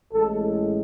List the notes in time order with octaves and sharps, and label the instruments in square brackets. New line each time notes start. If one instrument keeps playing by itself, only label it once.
[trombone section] A1 A2 G#3 A4